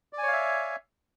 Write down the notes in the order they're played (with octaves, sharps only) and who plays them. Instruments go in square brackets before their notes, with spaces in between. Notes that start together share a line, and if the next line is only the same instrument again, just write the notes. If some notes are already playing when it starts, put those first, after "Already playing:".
[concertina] D5
G#5
C#5
F5
E5